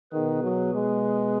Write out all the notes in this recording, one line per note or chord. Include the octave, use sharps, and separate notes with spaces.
B2 D#3 B3 G#4 B4
F#3
G#3